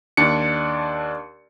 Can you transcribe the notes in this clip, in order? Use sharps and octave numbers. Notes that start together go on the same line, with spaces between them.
D#2 D4 D5 C#7